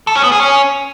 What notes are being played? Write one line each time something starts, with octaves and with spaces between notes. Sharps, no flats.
A4
C#4
B3
G#4
C#4